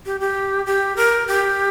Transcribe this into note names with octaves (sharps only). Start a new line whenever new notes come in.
G4
G4
G4
A#4
G4